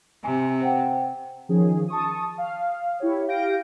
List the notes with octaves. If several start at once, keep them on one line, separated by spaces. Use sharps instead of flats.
C3 G#5
C5 F#5 G5
D#3 F3 C#4 G#4
A5 C#6 D#6
F5
E4 G4 C#5
G4 F5 G6 A#6 D7